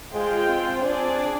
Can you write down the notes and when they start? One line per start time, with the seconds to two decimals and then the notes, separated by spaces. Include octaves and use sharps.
0.12 G#3 F4 C5 G5
0.48 C4
0.83 C4 D4 G#4 D5